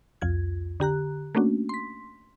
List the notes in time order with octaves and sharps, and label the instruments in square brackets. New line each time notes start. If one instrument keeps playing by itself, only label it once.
[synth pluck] C2 F2 F4 G#6
D3 G4 A#5 F#6
A3 A#3 C#4 D4 F#4
C6 B6